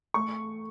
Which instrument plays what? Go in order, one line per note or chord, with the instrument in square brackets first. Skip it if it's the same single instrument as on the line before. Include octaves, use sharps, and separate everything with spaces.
[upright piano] A3 C#6